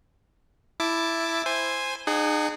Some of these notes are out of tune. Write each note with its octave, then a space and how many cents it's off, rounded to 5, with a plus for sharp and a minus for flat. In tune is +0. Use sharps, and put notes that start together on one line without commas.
E4 +5 A5 +0 D6 +0
C5 +0 G#5 -10
D#4 -40 G#4 +0 F#5 +20